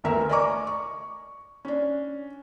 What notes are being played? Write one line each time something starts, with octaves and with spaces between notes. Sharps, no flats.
G1 D2 A3 A#4 E5
D5 D#5 G#5 A#5 C#6 D6
C#6
C#4 D4